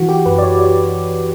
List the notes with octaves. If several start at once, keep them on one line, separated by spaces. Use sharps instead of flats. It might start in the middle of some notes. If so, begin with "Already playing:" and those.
Already playing: E3 F#4
G4
F#2 B4
D5
C#5
D5